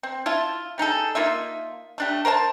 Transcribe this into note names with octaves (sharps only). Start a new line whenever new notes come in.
C4
E4 F4 A5
G3 D#4 G#4 A4
A#3 D#4 F4 E5
A3 D4 G4
A#4 C5 C#5 A5